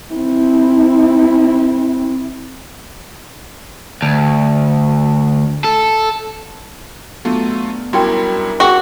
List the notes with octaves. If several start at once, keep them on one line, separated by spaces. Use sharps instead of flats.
C4 E4
D2
A4
G2 F#3 A3 B3 D4 F4
F#2 G3 D4 E4 F#4 A#4 C#5 G5
G3 C#4 E4 F#4 G#4 G5